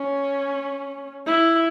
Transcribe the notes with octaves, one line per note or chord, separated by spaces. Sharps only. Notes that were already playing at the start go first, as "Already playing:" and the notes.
Already playing: C#4
E4